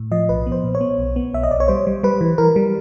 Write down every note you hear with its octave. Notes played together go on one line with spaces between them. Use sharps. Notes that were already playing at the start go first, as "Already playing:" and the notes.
Already playing: A2
F3 D#5
B1 B4
B3
C5
A#2
C#5
B3
B1
B3
B1 E5
D#5
B1 D5
C#5
G3 C5
G3
G3 B4
E3
E3 A#4
G3